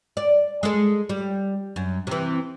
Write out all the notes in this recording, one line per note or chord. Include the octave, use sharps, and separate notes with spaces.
D5
G#3 A4
G3
F#2
C3 E3